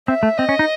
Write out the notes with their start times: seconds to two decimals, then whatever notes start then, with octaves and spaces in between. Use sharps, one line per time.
0.08 C4 E5
0.23 A3
0.38 C4 D#5
0.49 C#4
0.59 D#4